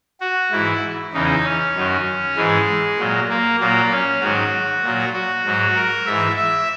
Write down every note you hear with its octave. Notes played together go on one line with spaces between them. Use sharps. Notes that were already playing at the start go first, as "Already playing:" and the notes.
F#4
G#2 E3 E4
E2 C#3 E3 D#4
C#4
F#2 D#3 F#3
G#2 E3 G#3
A#2 F#3
A#3
A#2 F#3 A#3
C#4
G#2 D#3 F#3 F#4
A#2 F#3
F#4
G#2 F#3
A#4
G#2 E3 E5
E5